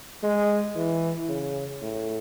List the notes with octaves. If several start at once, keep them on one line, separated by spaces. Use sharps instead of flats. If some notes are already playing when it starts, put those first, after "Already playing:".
G#3
E3
C#3
A2